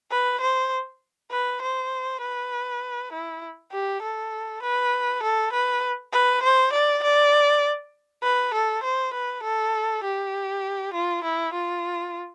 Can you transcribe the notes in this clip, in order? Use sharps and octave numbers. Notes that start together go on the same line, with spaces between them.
B4
C5
B4
C5
B4
E4
G4
A4
B4
A4
B4
B4
C5
D5
D5
B4
A4
C5
B4
A4
G4
F4
E4
F4